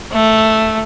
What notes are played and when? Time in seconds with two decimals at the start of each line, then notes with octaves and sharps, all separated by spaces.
0.12 A3